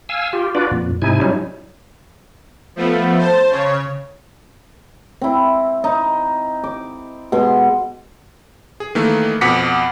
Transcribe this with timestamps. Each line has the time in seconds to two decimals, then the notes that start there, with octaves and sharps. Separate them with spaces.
0.09 F5 G#5 E6
0.33 F4 G4
0.55 D4 F4 F#4 B4 D5
0.71 F2 A#2
1.02 G#2 C3 D#4 E4 G#5
1.21 F#3 G3 C#4 D#4 E4
2.76 F3 A3 B3
3.18 C5 A5
3.51 C#3 C#5
5.21 C4 E4
5.84 D#4
6.64 D6
7.32 B2 G#3 C6
8.80 G#4
8.95 D#3 E3 A3 A#3
9.41 F2 B2 F#5 D6 B6 C#7